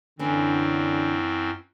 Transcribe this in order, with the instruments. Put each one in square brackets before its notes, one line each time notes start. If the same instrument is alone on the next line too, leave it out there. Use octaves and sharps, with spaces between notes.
[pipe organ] F#2 C4 [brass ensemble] D3 [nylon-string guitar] E3 C#4